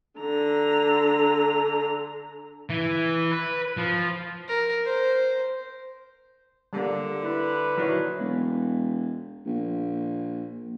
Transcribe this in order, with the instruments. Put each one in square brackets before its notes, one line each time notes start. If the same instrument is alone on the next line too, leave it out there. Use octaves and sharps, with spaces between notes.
[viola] D3 A#5
[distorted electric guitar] E3
B4
F3
[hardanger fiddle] A#4
C5
[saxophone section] D3 [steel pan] G3 A#3
[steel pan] E4 [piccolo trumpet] B4
[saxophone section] A#2 D#3 D4 [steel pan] F#3 E4 C#5
[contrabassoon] E1
A#1